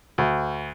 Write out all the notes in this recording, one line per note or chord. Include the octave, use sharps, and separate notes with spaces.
D2